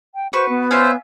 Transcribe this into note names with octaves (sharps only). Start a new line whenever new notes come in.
G5
F#4 B4 C5 C#6
B3
C#4 F4 C5 E5